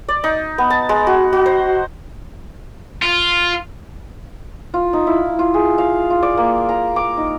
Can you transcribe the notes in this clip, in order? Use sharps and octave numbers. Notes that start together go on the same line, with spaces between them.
D5
D#4
B3
A5
G#3
F#4
F#4
C5
F4
F4
D#4
E4
F4
G#4
F5
F4
D5
A#3
A#5
D6
D#4